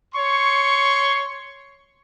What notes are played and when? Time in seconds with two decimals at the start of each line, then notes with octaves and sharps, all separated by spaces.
0.15 C#5 C6 C#6